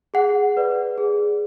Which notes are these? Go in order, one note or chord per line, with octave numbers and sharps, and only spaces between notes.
G#4 F#5
B4 D5
G#4